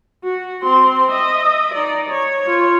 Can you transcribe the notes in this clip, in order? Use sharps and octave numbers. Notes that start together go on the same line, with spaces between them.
F#4
C4 C6
D#5 E5
D#4 D5
C#5
F4 C#5